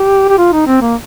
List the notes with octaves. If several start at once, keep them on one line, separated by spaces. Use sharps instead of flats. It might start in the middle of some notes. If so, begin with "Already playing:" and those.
Already playing: G4
G4
F4
D#4
C4
A#3